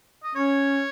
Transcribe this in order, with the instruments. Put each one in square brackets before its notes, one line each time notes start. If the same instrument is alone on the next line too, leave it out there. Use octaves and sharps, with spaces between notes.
[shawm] D#5
[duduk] C#4 [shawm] C#5